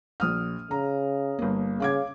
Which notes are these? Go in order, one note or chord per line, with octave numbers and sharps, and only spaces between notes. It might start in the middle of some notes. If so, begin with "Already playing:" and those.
A#1 D#6 F6
C#3 A#5
G1 A#3
C#3 F5 D6 G#6